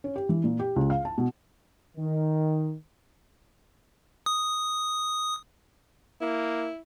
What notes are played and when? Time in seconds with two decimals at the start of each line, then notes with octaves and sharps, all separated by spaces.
0.04 C#4
0.16 G4
0.29 E3
0.44 A#2
0.59 G4
0.76 C#2
0.90 F5
1.05 A5
1.18 B2
1.97 D#3
4.26 D#6
6.21 A#3 E4